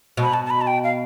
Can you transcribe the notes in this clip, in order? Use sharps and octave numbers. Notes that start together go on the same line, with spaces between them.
B2
B5
A5
A5
B5
A5
G5
F5